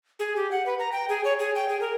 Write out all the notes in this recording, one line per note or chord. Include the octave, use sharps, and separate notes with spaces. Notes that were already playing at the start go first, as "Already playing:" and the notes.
G#4
G4
F#5
B4
A#5
G5
G#4
C#5
G#4
G5
G#4
A#4